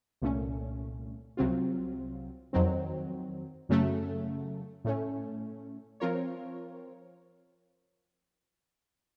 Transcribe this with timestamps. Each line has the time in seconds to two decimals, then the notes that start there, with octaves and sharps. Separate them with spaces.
0.21 C2 A#2 A3 C#4
1.37 C2 C3 F#3 C4 F4
2.53 F2 D#3 F#3 C4
3.69 F#2 C#3 F#3 A3
4.85 A2 A3 C#4
6.00 F3 C4 F4 A#4 C#5